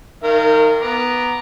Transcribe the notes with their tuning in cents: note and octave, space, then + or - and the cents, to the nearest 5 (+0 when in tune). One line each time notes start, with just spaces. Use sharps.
D#3 +0 A#4 -25 F5 -35
B3 +0 A#5 +0 D6 +0